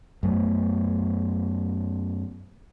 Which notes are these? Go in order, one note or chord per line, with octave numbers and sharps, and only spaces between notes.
F#2 A3 B3